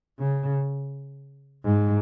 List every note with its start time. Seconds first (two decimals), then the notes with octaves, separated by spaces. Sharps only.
0.19 C#3
1.64 G#2